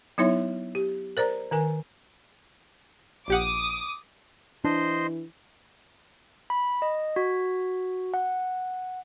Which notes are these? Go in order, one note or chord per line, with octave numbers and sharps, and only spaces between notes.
F#3 B3 D#4 E4 C#5 E5
G4
A#4 C5 D5 A#5
D#3 A#4 G#5
A#1 G4 F#5 D6 D#6
E3 D4 C5 D#5 C6
B5
D#5
F#4
F#5